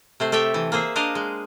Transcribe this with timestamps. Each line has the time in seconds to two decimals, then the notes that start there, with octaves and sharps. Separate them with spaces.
0.20 C3 A3 C5
0.32 A3 G4 A4 E5 G5
0.54 E3
0.72 A#3 G#4 C5 E5
0.96 D4 A#4 C5 D#5 F5
1.15 G#3